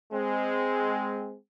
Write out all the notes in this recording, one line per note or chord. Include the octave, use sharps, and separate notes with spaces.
G#3 C4